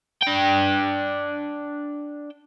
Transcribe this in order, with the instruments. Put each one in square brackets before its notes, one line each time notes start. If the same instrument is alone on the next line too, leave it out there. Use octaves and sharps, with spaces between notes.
[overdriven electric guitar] D4 G5